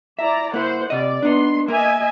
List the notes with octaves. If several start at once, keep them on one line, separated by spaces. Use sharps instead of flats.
E4 D5 E5 A#5
A#3 E4 C5 F#5
C3 D5 D#5
B3 D4 D#4 C6
A#3 A#4 D#5 E5 G#5